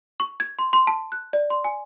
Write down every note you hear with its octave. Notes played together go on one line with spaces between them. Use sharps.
C#6
G#6
C6
C6
A5
F#6
D5
C6
G#5